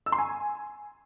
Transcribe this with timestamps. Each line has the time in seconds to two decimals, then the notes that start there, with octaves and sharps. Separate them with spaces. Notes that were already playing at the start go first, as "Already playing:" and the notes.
0.06 E6
0.12 C6
0.18 G#5